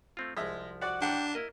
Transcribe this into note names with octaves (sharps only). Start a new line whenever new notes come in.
A3 C4 F4
C2 F3 G#3 E5
F#4 D5 F#5
A1 D4 F#5 G5
E4 A#4 D#5